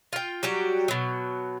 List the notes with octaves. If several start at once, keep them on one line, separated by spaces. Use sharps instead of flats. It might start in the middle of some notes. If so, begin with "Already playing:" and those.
F4 G5
F#3 G3 F#4 G4
B2 F#3